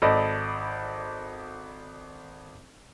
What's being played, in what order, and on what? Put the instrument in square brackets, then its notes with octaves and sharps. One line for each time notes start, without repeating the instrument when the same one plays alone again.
[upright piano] G#1 A4 D5 D#5 B5